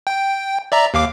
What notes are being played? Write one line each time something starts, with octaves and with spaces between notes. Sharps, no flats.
G5
D5 E5 A#5
D#2 F5 D6